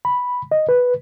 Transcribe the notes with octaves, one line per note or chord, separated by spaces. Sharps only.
B5
D#5
B4